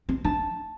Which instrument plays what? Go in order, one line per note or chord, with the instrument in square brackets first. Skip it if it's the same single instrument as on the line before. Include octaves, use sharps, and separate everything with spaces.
[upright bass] C4
[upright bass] D4 [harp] A5